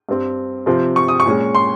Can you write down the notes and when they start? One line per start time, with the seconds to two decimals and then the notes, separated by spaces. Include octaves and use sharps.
0.09 G2 G3 C4
0.66 C3 F3 C4
0.96 C#6
1.08 D#6
1.20 C#6
1.26 A#2 G#3 C#4
1.55 C6